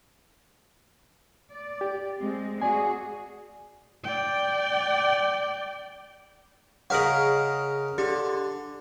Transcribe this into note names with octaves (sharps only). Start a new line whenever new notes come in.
D5
G4
G#3 C4
F#4 G#4 D5 G#5
D5 G5
C#3 G#4 A#4 D#5 F#5
D3 G4